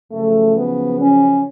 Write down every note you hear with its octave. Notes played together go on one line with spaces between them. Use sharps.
F#2 C#3 F3 A3
B3
C#4